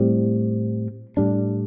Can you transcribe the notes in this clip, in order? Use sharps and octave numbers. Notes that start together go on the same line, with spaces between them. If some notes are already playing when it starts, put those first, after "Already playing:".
Already playing: A2 G3 C4
A2 G3 D4